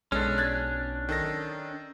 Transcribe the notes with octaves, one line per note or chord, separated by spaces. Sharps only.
B1 G#3 C#4 D4 A4
F#6 G#6 A6
D#3 A4 A#6